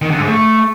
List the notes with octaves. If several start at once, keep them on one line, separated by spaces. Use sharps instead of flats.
D#3
D3
G#2
A3